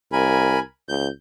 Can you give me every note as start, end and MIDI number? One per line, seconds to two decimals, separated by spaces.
0.12 0.59 36
0.12 0.59 70
0.12 0.59 80
0.12 0.59 83
0.89 1.08 37
0.89 1.07 91